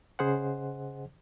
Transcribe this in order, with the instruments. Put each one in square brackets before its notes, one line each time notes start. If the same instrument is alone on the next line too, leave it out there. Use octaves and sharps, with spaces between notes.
[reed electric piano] C#3 G#4 C5 D#5 F#5